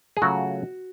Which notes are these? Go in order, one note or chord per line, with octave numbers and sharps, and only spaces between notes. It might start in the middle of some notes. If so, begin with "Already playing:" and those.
G#4
C#3 F#3 A3 F4 F#4